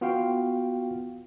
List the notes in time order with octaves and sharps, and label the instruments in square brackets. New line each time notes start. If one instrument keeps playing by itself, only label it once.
[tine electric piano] B3 F4 F#4 F5 G5